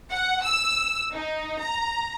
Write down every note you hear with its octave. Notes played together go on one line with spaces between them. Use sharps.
F#5
E6
D#4
A#5